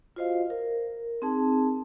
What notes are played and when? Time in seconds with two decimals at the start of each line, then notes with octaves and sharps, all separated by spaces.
0.16 F4 F#4 C5 D#5 F5
0.50 A#4
1.22 C4 D#4 G#4 A5